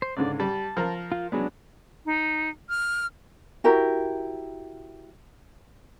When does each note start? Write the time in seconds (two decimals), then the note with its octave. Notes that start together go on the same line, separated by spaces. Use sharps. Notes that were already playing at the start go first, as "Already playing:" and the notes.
0.02 C5
0.17 C#2 G#2 D3 D5
0.40 G3 A5
0.77 F3 A#4 A#5
1.12 F4
1.32 F#3 G#3 B3 D4
2.05 D#4
2.69 F6
3.64 E4 F#4 G4 A#4